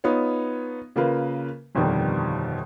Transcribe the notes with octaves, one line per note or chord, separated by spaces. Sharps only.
B3 D#4 F4 C#5
C#3 A#3 F4 A#4 B4
G1 F2 B2 D#3 G3